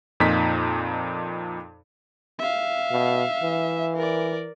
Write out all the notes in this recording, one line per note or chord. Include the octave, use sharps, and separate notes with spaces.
F2 A#2 D#4 A#5 B6
E5 F5
B2
E3
A#4 D5